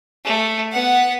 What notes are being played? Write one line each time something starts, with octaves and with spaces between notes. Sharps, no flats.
A3
B3 F#5